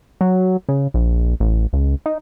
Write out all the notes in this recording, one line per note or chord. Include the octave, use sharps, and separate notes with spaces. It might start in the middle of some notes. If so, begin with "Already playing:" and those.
F#3
C#3
A#1
A1
C#2
D#4